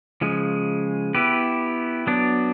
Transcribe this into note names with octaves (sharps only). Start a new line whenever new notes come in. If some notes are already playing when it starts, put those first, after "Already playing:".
C#3 F3 G#3
B3 E4 G4 B4
F#3 B3 D4